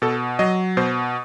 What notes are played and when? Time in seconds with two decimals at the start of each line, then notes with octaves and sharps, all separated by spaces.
0.02 B2 A4
0.39 F#3 D#5
0.77 B2 C5